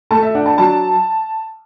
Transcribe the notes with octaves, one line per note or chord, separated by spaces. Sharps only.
A3 A5
E5
D4 F#5
A5
F#3 A5